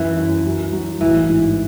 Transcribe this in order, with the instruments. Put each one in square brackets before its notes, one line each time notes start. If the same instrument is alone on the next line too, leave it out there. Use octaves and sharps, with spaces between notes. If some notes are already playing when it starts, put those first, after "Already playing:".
Already playing: [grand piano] F#2 [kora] E3
[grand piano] F#2
F#3
F#3
[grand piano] A1 [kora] E3
[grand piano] G#2